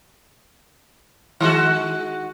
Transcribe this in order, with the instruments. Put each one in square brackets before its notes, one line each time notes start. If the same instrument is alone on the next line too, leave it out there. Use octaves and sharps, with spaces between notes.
[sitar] D#3 G#3 F#4